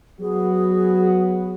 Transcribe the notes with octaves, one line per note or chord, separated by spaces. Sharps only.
F#3 B3 F#4 G#4